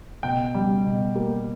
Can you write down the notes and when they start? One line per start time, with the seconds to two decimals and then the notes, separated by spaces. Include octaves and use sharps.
0.23 B2 G5
0.54 G3
0.85 B2
1.16 A#3